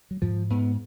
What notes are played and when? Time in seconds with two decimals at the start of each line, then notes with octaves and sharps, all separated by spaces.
0.11 F#3
0.22 G#2 F3
0.50 G#2 B3